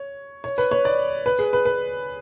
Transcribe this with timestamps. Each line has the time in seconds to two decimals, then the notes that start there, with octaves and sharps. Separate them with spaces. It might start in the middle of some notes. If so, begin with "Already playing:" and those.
Already playing: C#5
0.44 C#5
0.58 B4
0.71 C#5
0.85 D5
1.26 B4
1.39 G#4
1.53 B4
1.65 B4